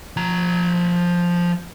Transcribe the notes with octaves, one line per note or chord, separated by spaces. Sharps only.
F3 A#5